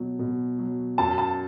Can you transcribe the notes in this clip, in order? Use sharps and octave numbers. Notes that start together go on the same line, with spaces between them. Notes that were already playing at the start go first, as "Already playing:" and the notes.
Already playing: B2 F#3
B2
F#3
F#2 A5
A5